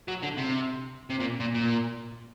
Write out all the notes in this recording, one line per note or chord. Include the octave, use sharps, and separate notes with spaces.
F#3
D3
C3
C3
A#2
A#2
A#2